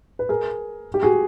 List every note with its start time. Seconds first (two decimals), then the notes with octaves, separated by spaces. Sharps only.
0.19 B4
0.29 G#4 A#4
0.94 G4
1.03 F#4 G#4